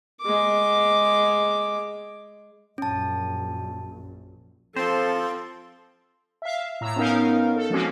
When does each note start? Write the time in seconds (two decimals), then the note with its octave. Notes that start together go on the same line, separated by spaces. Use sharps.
0.21 G#3 D6
2.78 A#1 F#2 C#4 A5
4.76 F3 C4 A4 C5 C6
6.42 E5 F5
6.81 A2 A#5 E6
6.96 B3 C#4 D#4 A#4 F5
7.56 A4
7.70 F3 G#3 A#3 C4 C#4 F#4